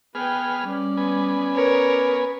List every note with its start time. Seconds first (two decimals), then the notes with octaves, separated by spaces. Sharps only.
0.15 B3 G#4 B4 G5 F6
0.63 G3 C#4 D5
0.97 B3 G#5
1.55 A#4 B4 C#5